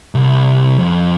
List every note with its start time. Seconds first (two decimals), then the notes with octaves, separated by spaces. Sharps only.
0.15 C2
0.79 F2